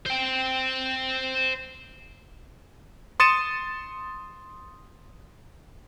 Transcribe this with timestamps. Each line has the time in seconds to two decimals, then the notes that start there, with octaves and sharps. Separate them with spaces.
0.06 C5 G5
3.20 C6 D#6 A6 C#7 D#7 E7